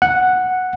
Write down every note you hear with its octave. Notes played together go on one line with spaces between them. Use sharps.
F#5